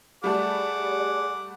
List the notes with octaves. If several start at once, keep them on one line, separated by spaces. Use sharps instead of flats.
G3 A3 G#4 D5 F#5 A5 D6